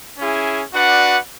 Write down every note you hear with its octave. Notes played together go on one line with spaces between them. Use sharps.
C#4 E4 G#4
D4 F#4 B4 D5 F#5